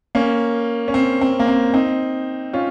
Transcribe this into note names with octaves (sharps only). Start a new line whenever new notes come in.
A#3 C#4
C#4
C4
C4
A#3
C4
C4 D#4
C#4 F4